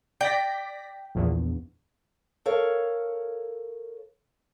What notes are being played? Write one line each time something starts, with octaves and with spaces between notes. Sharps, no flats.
D5 G5 A#6 B6
A#1 E2
A4 A#4 C#5 F5